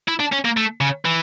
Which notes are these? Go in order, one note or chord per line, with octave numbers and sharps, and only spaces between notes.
E4
D4
C#4
A#3
A3
C#3
E3